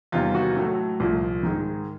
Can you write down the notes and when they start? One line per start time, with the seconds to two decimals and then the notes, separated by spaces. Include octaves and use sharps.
0.12 E2 C3 D#3 G3 A#3 F4
0.35 F#4
0.56 A2 F#3 A3
1.00 C2 A#2 F3
1.43 G#2 D#3 G#3